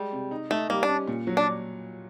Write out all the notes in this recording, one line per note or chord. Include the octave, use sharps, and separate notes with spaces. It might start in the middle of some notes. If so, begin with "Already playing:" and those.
Already playing: G3 G#3
C3
D#4
A3 D#4
G3 A#3
D4
C#4
A#2
F#3
D4